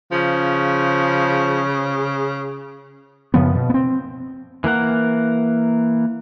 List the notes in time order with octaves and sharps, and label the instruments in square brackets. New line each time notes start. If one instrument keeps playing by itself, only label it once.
[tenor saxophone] C#3 [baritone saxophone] F3
[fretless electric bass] F#2 C#3 F3 B3
B2
B3 C4
[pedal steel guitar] E3 A#3 A#4 F#5